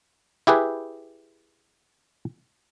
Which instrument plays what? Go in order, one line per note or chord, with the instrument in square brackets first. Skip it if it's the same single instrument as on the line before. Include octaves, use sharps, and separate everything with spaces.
[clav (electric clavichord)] E4 G4 G#4 B4